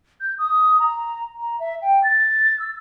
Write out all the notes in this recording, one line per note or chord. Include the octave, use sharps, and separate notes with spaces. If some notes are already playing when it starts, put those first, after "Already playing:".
G6
D#6
A#5
A#5
E5
G5
A6
E6